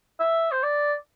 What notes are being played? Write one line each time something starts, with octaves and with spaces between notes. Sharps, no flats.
E5
C5
D5